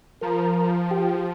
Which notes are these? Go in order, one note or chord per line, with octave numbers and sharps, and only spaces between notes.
F3 A#4 A#5
G4 G5